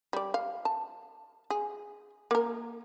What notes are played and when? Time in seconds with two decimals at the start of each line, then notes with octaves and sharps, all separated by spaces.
0.13 G3 D5
0.34 F5
0.65 A5
1.50 G#4
2.31 A#3 A#4